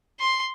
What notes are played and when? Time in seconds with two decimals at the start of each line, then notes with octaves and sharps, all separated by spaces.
0.20 C6